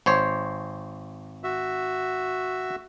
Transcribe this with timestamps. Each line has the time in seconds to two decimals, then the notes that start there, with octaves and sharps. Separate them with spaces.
0.06 G#1 C5 C#5
1.44 F#4 E5